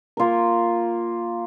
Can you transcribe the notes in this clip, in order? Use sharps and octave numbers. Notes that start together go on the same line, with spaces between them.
A#3 F4 A#4